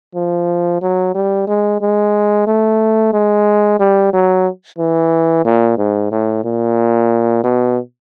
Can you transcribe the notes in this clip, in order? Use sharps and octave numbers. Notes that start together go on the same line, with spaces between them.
F3
F#3
G3
G#3
G#3
A3
G#3
G3
F#3
E3
A#2
G#2
A2
A#2
B2